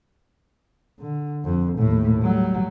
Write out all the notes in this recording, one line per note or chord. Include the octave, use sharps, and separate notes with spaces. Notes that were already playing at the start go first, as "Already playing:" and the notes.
D3
F2
D#2 A2
F#3 G3